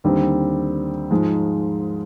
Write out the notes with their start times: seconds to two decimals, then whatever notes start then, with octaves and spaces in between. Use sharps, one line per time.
0.04 D#2 D3 G3 C4
1.11 G#2 F3 G#3